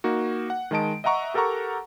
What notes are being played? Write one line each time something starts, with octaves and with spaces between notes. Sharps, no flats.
A#3 D#4 F#4
F#5
D#3 G#3 D#5 A5 D7
D#5 E5 F#5 A#5 C#6
G4 A4 A#4 F#5 A#5 C#6